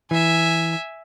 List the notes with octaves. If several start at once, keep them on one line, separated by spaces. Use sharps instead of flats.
E3 E5 G#5